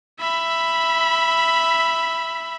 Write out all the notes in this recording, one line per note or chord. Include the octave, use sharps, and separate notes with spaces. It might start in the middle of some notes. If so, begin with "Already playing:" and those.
E5 B5